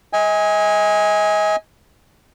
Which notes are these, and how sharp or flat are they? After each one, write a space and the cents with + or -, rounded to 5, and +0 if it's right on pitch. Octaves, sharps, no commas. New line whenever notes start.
D#5 +35 G#5 -10